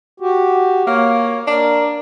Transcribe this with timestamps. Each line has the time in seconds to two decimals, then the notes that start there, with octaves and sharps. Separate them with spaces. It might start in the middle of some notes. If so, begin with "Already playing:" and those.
0.20 F#4 G4
0.87 A#3 C#5
1.48 D4 A#4